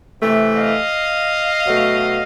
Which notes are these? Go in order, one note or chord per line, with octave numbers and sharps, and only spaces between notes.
C3 E3 A3
D#5 F5
B2 F#3 A3